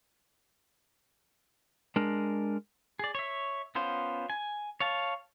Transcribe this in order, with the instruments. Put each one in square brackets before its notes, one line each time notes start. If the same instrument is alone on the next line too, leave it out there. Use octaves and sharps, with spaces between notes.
[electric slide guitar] G#3 D4 A#4
[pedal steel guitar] G#4 D5
C#5 E5
B3 C#4 F4 C5
G#5
C#5 F5 A5